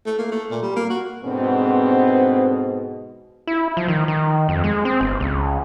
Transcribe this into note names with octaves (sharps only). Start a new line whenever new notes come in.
A3
A#3
A3
A#2
G3
A#3
F#4
G#2 B2 D3 B3 C4
E4
F3
D#3
D#3
F2
G#3
C4
G1
C#2